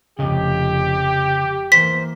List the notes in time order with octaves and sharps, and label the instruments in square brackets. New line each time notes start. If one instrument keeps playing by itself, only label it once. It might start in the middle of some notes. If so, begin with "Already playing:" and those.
[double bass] F1 F2 [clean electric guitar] C#3 D#5 [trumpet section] G4
[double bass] E3 A#3 [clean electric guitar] C5 [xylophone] B6